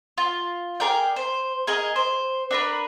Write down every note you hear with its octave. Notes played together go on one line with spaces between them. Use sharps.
F4
G#4 A#4 D5 G5
C5
G#4 A#4 D#5 G#5
C5
D4 A#4 B4